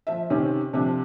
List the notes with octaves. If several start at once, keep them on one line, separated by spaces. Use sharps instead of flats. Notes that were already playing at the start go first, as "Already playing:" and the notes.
F3 E5
C3 D#3 C4 C#4
C3 F3 D4